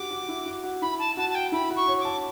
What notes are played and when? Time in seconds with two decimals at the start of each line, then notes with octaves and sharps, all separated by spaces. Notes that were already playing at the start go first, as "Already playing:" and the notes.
Already playing: F#4 G4 D6
0.11 F#4
0.28 E4
0.46 F#4
0.64 F#4
0.82 E4 B5
0.99 A5
1.17 F#4 A5
1.29 A5
1.35 G5
1.52 E4 B5
1.70 F#4
1.76 C#6
1.87 C#5
2.00 D6
2.05 A5